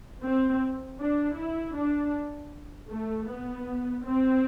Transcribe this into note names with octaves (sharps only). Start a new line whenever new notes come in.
C4
D4
E4
D4
A3
B3
C4